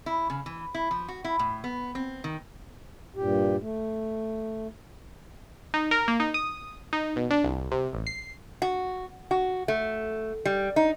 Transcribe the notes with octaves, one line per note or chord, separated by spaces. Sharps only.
E4
C#3
E3
E4
F3
F#4
E4
A2
B3
C4
D#3
G2 A#2 G4
A3
D#4
A#4
A#3
D#4
D#6
D#4
B2
D4
C2
C3
A1
C7
F#4
F#4
A3
G3
D#4